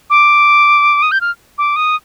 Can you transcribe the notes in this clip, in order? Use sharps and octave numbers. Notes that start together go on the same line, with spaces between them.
D6
D#6
G6
F6
D6
D#6